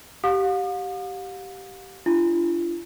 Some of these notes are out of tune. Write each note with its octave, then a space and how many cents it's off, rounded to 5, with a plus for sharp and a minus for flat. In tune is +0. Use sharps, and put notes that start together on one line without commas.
G4 -15 F5 +45 D#6 -45
D4 +0 F4 -40